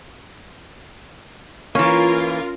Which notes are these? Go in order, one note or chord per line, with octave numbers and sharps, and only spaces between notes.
E3 A#3 C#4 F4 A#4